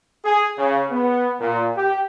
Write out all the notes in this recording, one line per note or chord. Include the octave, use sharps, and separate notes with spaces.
G#4
C#3
B3
A#2
G4